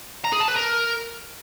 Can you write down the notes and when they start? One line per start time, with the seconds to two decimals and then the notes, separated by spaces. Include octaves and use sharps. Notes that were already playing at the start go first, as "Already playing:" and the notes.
0.24 A#5
0.32 G#4
0.40 A5
0.48 B4
0.56 A#4